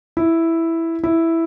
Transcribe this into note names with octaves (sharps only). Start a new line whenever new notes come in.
E4
E4